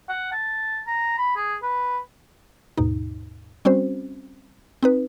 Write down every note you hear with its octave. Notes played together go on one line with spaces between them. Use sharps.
F#5
A5
A#5
B5
G#4
B4
D#2 G#2 B2 D#4
G3 C4 C#4 F#4 C5
C4 D#4 B4